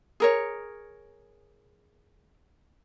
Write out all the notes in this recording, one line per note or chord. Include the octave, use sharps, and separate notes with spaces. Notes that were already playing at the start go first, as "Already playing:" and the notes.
G#4 A#4 C#5